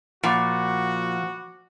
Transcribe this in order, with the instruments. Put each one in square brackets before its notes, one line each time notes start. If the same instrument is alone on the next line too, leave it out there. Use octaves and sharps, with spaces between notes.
[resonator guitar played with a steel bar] A#2 [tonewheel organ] F3 [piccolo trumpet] F#4 [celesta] F#5 B5 D6